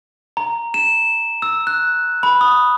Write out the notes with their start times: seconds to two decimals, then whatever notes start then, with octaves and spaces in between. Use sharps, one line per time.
0.37 A#5
0.74 E7
1.42 E6
1.67 F#6
2.23 B5
2.41 D#6